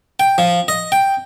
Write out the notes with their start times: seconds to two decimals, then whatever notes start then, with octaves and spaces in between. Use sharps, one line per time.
0.20 G5
0.38 F3
0.68 D#5
0.92 G5